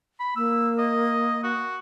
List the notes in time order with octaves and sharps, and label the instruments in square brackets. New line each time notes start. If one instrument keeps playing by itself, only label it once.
[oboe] B5
[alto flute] A#3 [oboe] E6
[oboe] D#5
F#4